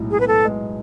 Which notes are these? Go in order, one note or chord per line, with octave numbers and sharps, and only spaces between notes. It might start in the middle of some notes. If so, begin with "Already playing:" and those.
Already playing: B1 A2 G#3
G#4
B3 B4
A4
G#3